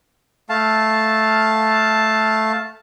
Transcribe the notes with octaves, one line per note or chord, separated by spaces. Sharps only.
A3 F5 A5